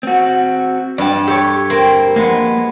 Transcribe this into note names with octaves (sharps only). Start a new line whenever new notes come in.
C4 F#4
G2 D5 G5 A5
G4 A4 C#5 G5
A#3 C4
F3 G#3 A#3 B3